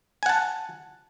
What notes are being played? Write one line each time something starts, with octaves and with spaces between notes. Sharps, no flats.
F#5 G#5 A5